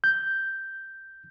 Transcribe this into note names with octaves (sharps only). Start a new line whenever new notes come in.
G6